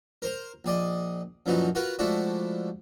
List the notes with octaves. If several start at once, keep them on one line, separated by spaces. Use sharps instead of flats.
A#4 C5 A#5
A#1 G#4 D5 D#5
F#2 A#2 E3 F3 D#4 F#4
F4 F#4 A#4 B4 F#5
F3 G#3 A3 D4 E4 F#4